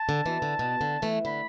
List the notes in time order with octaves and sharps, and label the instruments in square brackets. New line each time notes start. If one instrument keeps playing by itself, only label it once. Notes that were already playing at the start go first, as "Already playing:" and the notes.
Already playing: [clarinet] A5
[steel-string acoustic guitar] D3
B2 E3
D3
B2
D3
E3 A3
[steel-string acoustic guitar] D3 [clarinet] B5